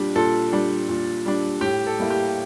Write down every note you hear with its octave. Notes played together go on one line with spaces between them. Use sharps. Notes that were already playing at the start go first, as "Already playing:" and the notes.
Already playing: A#2 G3 D4
A#2 A4
G3 D4
A#2
G3 D4
A2 G4
A4
G3 A#3 E4
G4